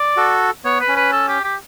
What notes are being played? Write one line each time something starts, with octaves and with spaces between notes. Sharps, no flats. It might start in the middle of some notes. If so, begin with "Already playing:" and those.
Already playing: D5
F#4 A4
B3 C#5
B4
C#4
B4
A4
G4
G4